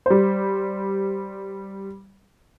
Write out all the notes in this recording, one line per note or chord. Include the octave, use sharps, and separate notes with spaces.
G3 C5